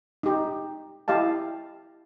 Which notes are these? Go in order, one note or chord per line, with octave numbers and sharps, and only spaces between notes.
D#4 G4
E4 G4 D#5 F5 A5